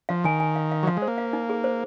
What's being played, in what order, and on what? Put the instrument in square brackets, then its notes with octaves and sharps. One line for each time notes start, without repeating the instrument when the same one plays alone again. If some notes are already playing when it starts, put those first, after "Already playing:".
[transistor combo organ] F3 [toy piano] F5
[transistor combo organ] D#3 [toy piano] G#5
[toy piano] G#5
F5
F5
[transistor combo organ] F#3
[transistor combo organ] F3 [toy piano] F5
[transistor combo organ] G#3
[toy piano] C5
[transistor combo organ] A#3
[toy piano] F5
D#4
G#4
C5